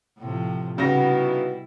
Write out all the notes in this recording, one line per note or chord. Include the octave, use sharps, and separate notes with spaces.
A2 C3 F3
C#3 G3 B3 D#4 E4 F#4 A#6